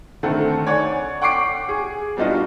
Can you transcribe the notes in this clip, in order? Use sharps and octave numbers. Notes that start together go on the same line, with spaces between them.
D3 D#3 A3 C4 A4 F#5
C#5 D5 F#5 G#5
F#5 G5 C#6 D6 C7 D7
G#4
G3 B3 D4 D#4 F4 F#4